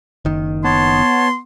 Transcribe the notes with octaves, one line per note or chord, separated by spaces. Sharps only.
F#1 D#3
B3 C#5 A5 C6